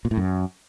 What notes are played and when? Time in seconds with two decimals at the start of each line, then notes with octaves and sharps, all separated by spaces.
0.05 A#2
0.11 A2
0.17 F#2